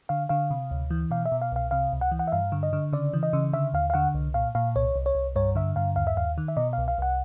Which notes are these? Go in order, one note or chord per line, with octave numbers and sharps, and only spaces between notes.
D3 F5
D3 F5
C3
D2
E3
B2 F5
E5
B2
F5
C2 F5
C3 F5
C#2
F#5
E3
F#5
E5
G2 F5
D3
D#5
D3
C#3 D5
E3
D#5
C#3
D3 E5
D#2 F5
F5
D3 F#5
C2
A#2 F5
A#2 F5
C2 C#5
C2
C#5
C2
G2 C#5
D3 E5
G2 F5
D#2 F5
E5
D#2 F5
D#3
E5
B2 D#5
C2 F5
F5
C2 F#5